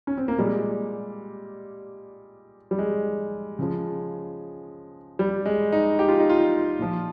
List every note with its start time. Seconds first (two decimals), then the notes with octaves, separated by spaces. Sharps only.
0.07 C#4
0.17 C4
0.28 A#3
0.38 A#2 G3 G#3
2.71 G3
2.78 G#3
3.59 C#3 F3
5.19 G3
5.45 G#3
5.72 D#4
5.99 G4
6.09 F4
6.20 D#4
6.29 F4
6.79 A#2 F3